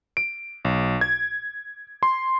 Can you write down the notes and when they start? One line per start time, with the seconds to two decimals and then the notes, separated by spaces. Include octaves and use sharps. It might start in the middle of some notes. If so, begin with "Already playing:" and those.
0.17 D7
0.65 B1
1.01 G#6
2.03 C6